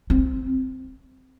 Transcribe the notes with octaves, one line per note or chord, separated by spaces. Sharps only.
C4